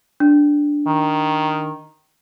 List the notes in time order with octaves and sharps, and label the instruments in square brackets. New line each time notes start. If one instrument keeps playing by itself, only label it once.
[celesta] D4
[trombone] D#3